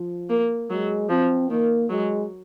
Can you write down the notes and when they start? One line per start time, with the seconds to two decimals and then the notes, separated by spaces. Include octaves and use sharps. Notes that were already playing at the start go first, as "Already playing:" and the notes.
Already playing: F3
0.30 A#3
0.70 F#3 G#3
1.09 F3 C4
1.50 D#3 A#3
1.90 F#3 G#3